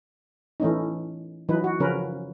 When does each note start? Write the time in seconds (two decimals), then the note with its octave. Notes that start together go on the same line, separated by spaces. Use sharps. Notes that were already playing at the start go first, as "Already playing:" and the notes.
0.60 E3 A3 C#4 D#4
1.49 E3 F#3 D#4 B4
1.64 F#4
1.80 C#3 F3 C#4 A#4 B4